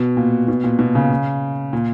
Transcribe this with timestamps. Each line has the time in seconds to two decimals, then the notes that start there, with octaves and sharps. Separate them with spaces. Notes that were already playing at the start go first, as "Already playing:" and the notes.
Already playing: B2
0.17 A#2
0.48 B2
0.64 A#2
0.79 B2
0.95 C#3
1.73 A#2